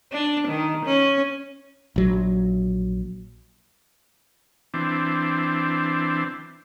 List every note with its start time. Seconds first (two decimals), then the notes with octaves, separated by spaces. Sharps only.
0.13 D4
0.47 D#3
0.85 C#4
1.96 A#1 F#3
4.74 E3 C4 D4